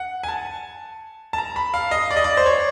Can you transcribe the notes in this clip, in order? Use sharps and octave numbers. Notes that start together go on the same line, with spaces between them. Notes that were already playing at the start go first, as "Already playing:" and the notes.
Already playing: F#5
G#5
A5
A5
A#5
B5
F5
D#5
D5
D#5
D5
C5
C#5